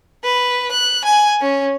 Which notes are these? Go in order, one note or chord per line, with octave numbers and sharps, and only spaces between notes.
B4
F#6
G#5
C#4